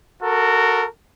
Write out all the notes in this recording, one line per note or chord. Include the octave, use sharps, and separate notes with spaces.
F#4 A4 A#4